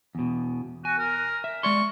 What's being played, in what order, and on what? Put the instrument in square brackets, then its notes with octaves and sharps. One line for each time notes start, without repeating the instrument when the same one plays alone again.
[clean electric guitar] E2 B2
[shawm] F#4 [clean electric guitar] G#5
[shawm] A#4
[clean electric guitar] E5
[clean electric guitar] G#3 D5 C6 [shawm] C#6